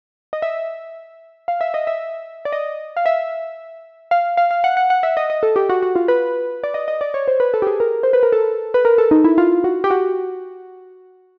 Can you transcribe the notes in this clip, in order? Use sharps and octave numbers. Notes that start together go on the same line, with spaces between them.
D#5
E5
F5
E5
D#5
E5
D5
D#5
F5
E5
F5
F5
F5
F#5
F#5
F#5
E5
D#5
D#5
A4
G4
F#4
F#4
F4
B4
D5
D#5
D#5
D5
C#5
C5
B4
A4
G4
G#4
A#4
C5
B4
A#4
A4
B4
A#4
A4
D#4
E4
F4
F#4
G4
F#4